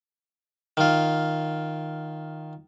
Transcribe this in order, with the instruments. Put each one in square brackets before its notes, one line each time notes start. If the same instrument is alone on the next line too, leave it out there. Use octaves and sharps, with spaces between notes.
[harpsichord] D#3 F4